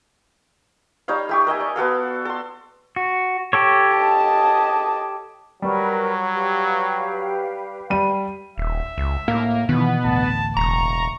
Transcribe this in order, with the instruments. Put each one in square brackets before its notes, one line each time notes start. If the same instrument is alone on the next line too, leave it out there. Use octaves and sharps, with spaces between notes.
[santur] G3 D#4 C#5 F5
A3 G4 C#6
A#4 D#5 E5 G#5
D5
B3 F#4 A4 F5
A4 C6
[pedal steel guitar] F#4
G4 A4 C#5
[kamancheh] D#5 A5
[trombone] F#3 [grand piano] G3 [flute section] A#4 B4 C#6
[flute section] G4 B4 F5
[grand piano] G3 D#7
[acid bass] D#1 [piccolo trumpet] E5
[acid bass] C#2
[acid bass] A2 [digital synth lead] A#3
[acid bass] B2 [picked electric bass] D#3 E3 [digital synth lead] B3
[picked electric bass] A1 D2 [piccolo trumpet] A5
[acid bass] E1 [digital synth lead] A#5 [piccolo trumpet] C#6